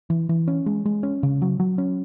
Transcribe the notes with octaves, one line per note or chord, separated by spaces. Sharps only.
E3
E3
C#4
G#3
G#3
C#4
C#3
F#3
F#3
C#4